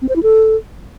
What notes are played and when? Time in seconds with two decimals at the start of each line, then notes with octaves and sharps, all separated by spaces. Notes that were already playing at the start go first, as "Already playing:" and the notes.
0.02 C4
0.09 C5
0.16 E4
0.23 A4